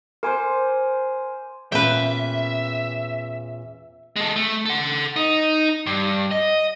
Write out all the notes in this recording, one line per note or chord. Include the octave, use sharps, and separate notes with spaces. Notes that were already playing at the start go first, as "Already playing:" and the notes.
A#4 C5 G#5 C6 D6
E2 A#2 C#4 B4 E5 G5
G#3 A4
A3
A4 F#5
D#4
G2
D#5